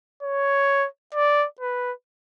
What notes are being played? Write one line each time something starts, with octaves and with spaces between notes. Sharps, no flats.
C#5
D5
B4